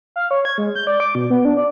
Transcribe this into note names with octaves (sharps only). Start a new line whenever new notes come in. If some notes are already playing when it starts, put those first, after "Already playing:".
F5
C#5
G#6
G#3
G6
D5
D6
B2
B3
D4
D5